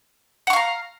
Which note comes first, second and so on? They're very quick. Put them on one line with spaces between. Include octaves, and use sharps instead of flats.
F#5 C#6 F5 A#5